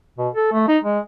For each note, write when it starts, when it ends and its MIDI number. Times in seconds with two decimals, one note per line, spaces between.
0.18 0.29 47
0.34 0.49 69
0.53 0.65 57
0.68 0.78 63
0.84 0.99 56